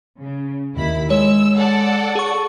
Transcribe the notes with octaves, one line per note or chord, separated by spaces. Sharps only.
C#3
D#2 E4 B5
G#3 C#5 E6
A4 D5 F#5
G#4 C#6